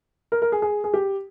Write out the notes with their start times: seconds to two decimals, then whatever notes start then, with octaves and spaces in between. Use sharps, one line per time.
0.32 A#4
0.42 A#4
0.52 G#4
0.62 G#4
0.84 G#4
0.94 G4